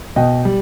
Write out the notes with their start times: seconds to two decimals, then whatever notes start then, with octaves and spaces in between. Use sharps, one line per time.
0.16 B2 D#5 G5
0.45 G3